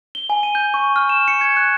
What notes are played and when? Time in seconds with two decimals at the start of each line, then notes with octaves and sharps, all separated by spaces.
0.15 G7
0.30 G#5
0.43 D#7
0.55 G6
0.74 C#6
0.96 F6
1.09 E7
1.28 C#7
1.41 G#6
1.57 F#6